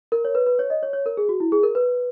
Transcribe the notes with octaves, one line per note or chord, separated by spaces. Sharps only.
A#4
C#5
B4
B4
C#5
D#5
C#5
C#5
A#4
G#4
F#4
E4
G#4
A#4
B4